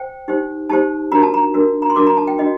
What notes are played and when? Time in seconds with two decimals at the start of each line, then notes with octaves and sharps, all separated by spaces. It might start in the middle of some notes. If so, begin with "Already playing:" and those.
Already playing: C5 G5
0.28 D#4 G4 C5
0.69 D#4 G4 C5 A5
1.11 D4 F#4 A#4 A#5
1.23 A5
1.34 A#5
1.54 D4 F#4 A#4
1.82 A#5
1.90 C6
1.96 D4 F#4 A#4 D6
2.07 A#5
2.17 A5
2.27 G5
2.38 D4 F#4 D#5